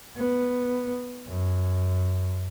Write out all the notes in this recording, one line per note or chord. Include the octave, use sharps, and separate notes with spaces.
B3
F#2